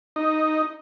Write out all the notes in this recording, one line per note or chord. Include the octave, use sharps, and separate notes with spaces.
D#4